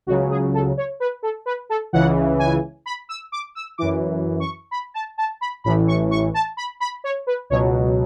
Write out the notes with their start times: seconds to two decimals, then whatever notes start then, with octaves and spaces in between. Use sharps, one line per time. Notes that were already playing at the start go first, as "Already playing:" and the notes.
0.06 C#2 F#4
0.09 C#3 F#3
0.30 G#4
0.54 A4
0.77 C#5
1.00 B4
1.23 A4
1.46 B4
1.69 A4
1.93 C#2 C#3 E3 F#5
2.39 G#5
2.86 B5
3.09 E6
3.32 D6
3.55 E6
3.78 F#2 E3 D6
4.40 C#6
4.71 B5
4.94 A5
5.18 A5
5.41 B5
5.64 A1 A2 E3 B5
5.88 C#6
6.11 C#6
6.34 A5
6.57 B5
6.80 B5
7.04 C#5
7.27 B4
7.50 C#2 B2 F#3 C#5